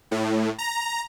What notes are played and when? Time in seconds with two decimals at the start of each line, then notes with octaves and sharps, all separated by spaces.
0.11 A2
0.58 A#5